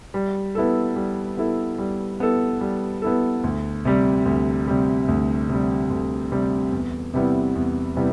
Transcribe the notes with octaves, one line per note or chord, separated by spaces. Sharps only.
G3
B3 E4 A4
G3
B3 E4 A4
G3
B3 E4 A4
G3
B3 E4 A4
D2
C3 G3
D2
C3 G3
D2
C3 G3
D2
C3 G3
E2
C3 G3 B3 E4
E2
C3 G3 B3 E4